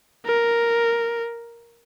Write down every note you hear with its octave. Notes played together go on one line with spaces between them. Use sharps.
A#4